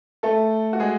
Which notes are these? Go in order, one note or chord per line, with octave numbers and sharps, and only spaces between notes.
A3 A4
F#4
G#3 G#4